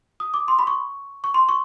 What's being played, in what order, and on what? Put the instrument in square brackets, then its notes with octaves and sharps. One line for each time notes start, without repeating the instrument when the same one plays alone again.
[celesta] D#6
D6
C6
B5
C#6
C#6
C6
C#6